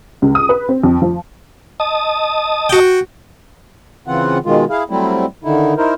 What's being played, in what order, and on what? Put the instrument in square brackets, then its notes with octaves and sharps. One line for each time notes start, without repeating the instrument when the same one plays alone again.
[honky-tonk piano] C#2
D#6
B4
C4
F2
F3
[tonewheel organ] D#5 A5 D#6
[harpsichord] F#4 G5
[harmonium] C#3 E3 C4 F4 F#5
B2 D#3 G#3 F4
E4 G#4 F5
F#3 G3 A3 C4 E4
D3 D#3 D#4 E4
D#4 E4 A#4 C5